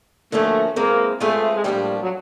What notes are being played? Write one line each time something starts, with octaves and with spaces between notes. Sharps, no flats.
D3 F3 A3 A#3 C#4 F#4
E3 G#3 A#3 C4
G#3 A3 C4 F4 G#4 B4
G#3
A2 F3 G3 A#3 D4 G4
F#3